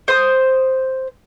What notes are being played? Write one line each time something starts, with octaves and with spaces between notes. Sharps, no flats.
C5 D#6